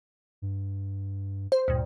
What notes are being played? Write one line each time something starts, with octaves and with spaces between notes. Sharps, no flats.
G2
C5
D2 G2 A#2